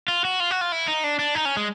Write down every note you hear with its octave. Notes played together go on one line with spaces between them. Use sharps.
F4
F#4
F4
F#4
F4
E4
D#4
D4
D4
D#4
C#4
G#3